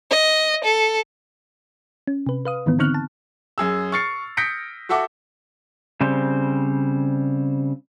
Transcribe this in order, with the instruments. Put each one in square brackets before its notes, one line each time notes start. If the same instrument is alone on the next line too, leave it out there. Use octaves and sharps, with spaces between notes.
[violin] D#5
A4
[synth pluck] C#4
C3 B4
B4 F5 D#6
G#2 D#3 E3 B3
D3 C4 D#4 C#6 F6 F#6
A5
[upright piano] F#2 G#4 E6
C#6 F6 A6 C7 C#7
D#6 G6 A#6 B6 C#7 D7
F#4 A4 E5 F#5 D6
[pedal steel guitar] C#3 G3 C4 C5